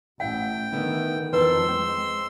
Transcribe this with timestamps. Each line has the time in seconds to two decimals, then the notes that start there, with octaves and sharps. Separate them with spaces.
0.20 A1 E4 F#5 G5
0.73 D3 D#3 B3 E4
1.33 F2 E3 C4 A#4 B4 A5 C6 E6
1.69 G#3 C4 G5